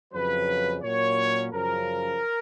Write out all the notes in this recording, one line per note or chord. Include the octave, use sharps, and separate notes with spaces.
F2 C#3 F#3 B4
A#2 F#3 A#3 C#4 C#5
F#2 C#3 F3 A#4